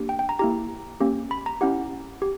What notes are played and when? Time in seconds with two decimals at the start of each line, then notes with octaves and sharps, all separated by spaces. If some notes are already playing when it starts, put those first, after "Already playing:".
Already playing: A#3 D4 G4
0.09 G5
0.19 G5
0.29 A#5
0.39 A#3 E4 G4 A#5
1.00 A#3 C#4 G4
1.31 B5
1.46 A#5
1.61 C#4 E4 G4 F#5
2.22 G4